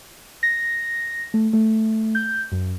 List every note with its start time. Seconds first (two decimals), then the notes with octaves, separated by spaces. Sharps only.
0.43 A#6
1.34 A3
1.53 A3
2.15 G6
2.52 F#2